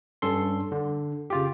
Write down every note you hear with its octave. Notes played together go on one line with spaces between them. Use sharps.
G2 C#4 A4 C6
D3
C#3 F4 G4